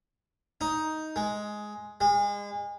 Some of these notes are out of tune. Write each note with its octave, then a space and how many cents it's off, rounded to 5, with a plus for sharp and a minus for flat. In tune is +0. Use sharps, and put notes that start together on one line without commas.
D#4 +10
G#3 +10
G#3 -30